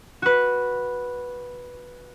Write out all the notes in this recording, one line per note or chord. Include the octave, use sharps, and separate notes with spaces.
F#4 B4